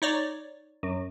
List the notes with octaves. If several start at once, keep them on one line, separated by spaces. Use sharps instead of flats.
D#4 C#5 D5
F#2